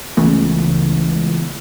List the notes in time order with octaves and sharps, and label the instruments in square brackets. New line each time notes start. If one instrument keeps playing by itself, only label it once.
[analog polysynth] C#2 [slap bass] E3 A3 B3